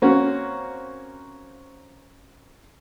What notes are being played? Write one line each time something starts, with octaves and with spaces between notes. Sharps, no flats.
A#3 C4 C#4 F#4